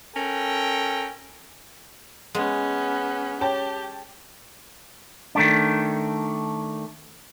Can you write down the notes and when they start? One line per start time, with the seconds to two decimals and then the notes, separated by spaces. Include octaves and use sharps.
0.15 C#4 A4 A#4 G5
2.35 G#3 B3 C#4
3.41 C#4 G4 G5 A5
5.35 D#3 A3 D4